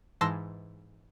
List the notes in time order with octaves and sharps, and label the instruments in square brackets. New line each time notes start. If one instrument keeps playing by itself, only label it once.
[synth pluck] G#2 E3 A5 C6 E6 A#6